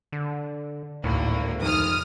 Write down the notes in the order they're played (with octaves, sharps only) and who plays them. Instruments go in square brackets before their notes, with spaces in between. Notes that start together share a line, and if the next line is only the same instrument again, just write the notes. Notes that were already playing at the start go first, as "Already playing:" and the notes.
[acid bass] D3
[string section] G#1 A#3 [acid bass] D2 [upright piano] A2
[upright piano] F1 D#3 [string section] D#6 F6